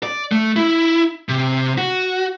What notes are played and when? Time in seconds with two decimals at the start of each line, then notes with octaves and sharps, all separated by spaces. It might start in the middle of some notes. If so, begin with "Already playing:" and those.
0.03 D5
0.32 A3
0.56 E4
1.29 C3
1.78 F#4